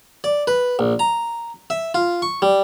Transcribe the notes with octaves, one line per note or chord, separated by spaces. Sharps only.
D5
B4
A#1
A#5
E5
F4
C#6
G3